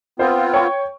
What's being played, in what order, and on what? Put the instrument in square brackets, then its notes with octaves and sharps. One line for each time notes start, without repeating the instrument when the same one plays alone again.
[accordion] B3 C4 F4 [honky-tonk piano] C5
[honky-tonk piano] C#5 G5 C#6